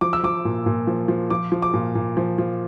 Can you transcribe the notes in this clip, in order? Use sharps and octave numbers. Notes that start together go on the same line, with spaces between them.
F3 D6
E6
F3 D6
A#2
A#2
F3
F3
F3 D6
F3
D6
A#2
A#2
F3
F3